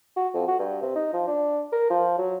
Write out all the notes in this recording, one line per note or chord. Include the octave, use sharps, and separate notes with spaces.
F#4
F2
F#4
G2
C3
D#4
F3
D4
A#4
F3
F#3